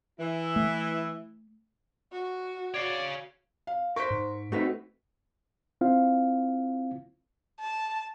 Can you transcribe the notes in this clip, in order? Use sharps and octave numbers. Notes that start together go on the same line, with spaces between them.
E3 E4
A3
F#4
C#5 D5 F5 D7
F5
A#4 C5 C#6 B6 D7
G#2
A3 C4 D#4 F#4 B4
C4 E4 F4 F5
A5